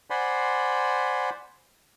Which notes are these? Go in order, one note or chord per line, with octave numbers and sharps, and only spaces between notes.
C5 D5 F#5 G#5 B5 C6